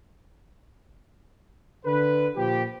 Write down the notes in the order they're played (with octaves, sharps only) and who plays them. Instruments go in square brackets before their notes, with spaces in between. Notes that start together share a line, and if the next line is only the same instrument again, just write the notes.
[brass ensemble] D3 B4
A#2 F3 G4